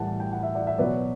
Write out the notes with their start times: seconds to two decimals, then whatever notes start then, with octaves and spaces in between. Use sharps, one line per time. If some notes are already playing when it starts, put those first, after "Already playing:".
Already playing: A2 E3 G3 F#5 A5
0.20 G5
0.32 F#5
0.43 E5
0.55 D5 F#5
0.67 E5
0.78 B2 F#3 B4 D5